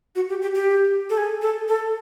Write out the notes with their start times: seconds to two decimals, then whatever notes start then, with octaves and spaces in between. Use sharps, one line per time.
0.16 F#4
0.29 G4
0.42 G4
0.55 G4
1.10 A4
1.17 G#4
1.42 A4
1.68 A4